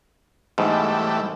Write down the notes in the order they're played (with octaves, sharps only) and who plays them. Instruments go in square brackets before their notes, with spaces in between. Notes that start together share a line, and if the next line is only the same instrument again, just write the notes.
[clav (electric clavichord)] G#2 B2 [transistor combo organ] E3 G3 A3